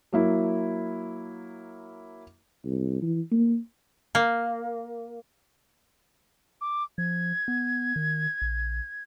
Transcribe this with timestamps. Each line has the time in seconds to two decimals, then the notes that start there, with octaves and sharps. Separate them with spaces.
0.13 F#3 A#3 E4
2.65 C2
3.02 E3
3.32 A#3
4.15 A#3
6.61 D6
6.98 F3 G#6
7.48 B3
7.96 D#3
8.42 A#1